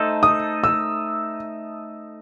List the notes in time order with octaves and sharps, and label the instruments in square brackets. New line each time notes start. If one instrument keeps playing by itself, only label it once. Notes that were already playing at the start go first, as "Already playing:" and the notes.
Already playing: [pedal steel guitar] A3 D#4 A4 C5
[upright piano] D#6
E6